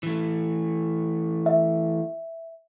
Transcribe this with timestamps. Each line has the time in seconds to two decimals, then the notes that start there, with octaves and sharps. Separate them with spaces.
0.03 E3 A3
1.46 E5